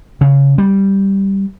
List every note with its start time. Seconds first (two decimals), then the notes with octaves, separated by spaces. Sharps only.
0.21 C#3
0.58 G3